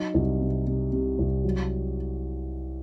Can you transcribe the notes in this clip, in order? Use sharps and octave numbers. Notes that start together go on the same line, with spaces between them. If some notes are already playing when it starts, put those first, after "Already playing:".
Already playing: F#3 D#4
C2
C3
C3
C3
C2
F#3